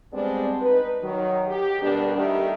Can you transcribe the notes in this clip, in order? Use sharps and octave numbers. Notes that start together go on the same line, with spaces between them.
G3 G#3 B3 C4 D4
D#4 B4
D#3 F#3
G4
D2 B2 G3 D4 A#4
D#3 G3 A3 G4